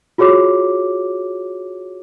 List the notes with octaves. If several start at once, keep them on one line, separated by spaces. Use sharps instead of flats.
F4 F#4 G#4 C#5 D6